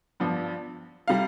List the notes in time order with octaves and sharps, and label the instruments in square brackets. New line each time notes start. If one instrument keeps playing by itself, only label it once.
[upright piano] G2 F3 B3 D4
C3 G3 F5